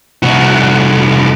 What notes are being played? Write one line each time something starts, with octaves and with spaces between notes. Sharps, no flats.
C2 F#4